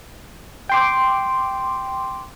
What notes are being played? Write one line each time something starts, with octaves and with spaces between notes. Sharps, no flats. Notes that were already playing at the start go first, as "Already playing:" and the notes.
G5 C6 D6